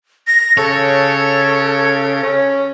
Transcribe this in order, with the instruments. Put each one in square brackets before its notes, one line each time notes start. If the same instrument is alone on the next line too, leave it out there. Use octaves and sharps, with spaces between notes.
[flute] A#6
[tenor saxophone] C#3 [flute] A4 [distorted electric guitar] C#5
[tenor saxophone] C#4